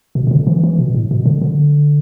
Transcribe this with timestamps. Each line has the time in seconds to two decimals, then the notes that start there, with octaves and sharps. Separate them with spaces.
0.15 B2
0.27 B2
0.31 D3
0.47 E3
0.64 E3
0.79 B2
0.95 A2
1.11 B2
1.26 D3
1.42 D3